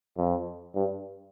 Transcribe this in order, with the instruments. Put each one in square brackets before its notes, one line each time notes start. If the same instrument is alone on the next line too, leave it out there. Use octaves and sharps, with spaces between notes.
[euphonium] F2
G2